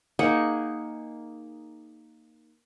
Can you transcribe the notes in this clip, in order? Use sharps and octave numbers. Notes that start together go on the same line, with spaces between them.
A#3 D#4 G#4 F#5